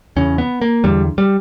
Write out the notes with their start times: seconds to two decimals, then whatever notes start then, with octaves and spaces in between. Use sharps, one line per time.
0.16 E2 C#3 C#4
0.38 B3
0.62 A#3
0.84 E2 D3 G3
1.18 G3